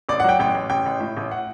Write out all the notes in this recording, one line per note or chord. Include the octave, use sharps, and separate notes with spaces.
A1 D5
F#5
F#3 G5
A1 G5
A1
A1 G5
A1
A2
A1
F#5